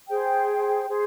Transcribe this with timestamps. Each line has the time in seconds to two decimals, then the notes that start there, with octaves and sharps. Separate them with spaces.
0.08 G#4 C5 G5
0.88 G#4 C5